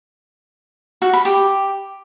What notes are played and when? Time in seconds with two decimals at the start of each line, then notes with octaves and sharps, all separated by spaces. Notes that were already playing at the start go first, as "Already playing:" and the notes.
1.02 F#4
1.13 B5
1.25 G4